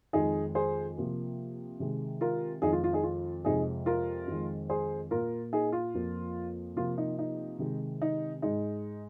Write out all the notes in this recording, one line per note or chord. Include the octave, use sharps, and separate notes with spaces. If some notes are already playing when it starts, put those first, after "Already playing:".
F2 D#3 G#3 D#4 G#4
G#4 C5
C3 F3 A#3
C3 D#3 G#3
F4 A#4
F2 D#3 G#3 D#4 G#4
F4
F4
D#4 G#4
F4
F2 C3 G#3 D#4 G#4
F4 A#4
F2 D#3 G#3
G#4 C5
A#2 A#3 F4 A#4
D#4 G#4
F4
F2 F3 A#3
C3 F3 A#3 F4
D#4
D#4
C3 D#3 G#3
D#4
G#2 G#3 D#4